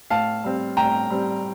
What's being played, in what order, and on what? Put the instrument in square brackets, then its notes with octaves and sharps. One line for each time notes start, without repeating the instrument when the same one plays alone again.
[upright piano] A2 F5 A5
G3 C4
A2 G5 A#5
G3 C4